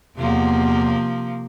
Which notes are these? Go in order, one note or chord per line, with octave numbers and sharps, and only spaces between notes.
E2 C3 F3 A#3